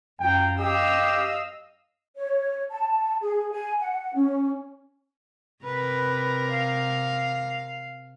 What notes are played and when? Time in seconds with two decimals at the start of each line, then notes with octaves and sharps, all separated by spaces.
0.20 F#2 F4 G5 A#5
0.59 G4 D#5 F5 E6
2.17 C#5
2.71 A5
3.21 G#4
3.52 G#5
3.80 F#5
4.14 C#4
5.64 C3 A#4 B4
6.51 F5